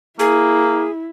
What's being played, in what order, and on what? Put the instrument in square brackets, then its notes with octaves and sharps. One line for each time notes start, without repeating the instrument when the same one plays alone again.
[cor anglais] A#3 [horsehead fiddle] E4 [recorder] G#4